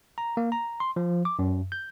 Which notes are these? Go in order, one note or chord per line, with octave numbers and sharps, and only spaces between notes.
A#5
A#3
A#5
C6
F3
D6
F#2
G6